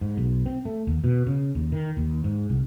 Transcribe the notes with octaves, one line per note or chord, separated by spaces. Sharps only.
G#2
B1
C4
A3
D#2
B2
C#3
D#2
D#3
D#2
G#2
C2